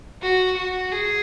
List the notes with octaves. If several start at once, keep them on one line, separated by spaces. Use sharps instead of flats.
F#4
F#4
G#4